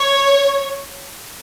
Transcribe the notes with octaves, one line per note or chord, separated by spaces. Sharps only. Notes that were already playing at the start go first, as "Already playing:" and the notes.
Already playing: C#5